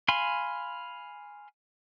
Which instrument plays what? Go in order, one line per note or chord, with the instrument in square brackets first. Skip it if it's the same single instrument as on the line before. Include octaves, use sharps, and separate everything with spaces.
[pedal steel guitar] F5 G#5 B5 C6